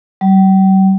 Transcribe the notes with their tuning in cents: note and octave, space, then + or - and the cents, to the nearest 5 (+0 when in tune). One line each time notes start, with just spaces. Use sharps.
G3 -40